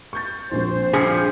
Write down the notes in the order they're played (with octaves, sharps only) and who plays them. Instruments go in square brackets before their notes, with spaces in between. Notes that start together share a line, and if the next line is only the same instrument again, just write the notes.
[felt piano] C#6 G6 A6
[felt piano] A#1 C4 [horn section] C5
[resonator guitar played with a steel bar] G2 F3 [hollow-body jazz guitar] G#4 [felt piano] C#7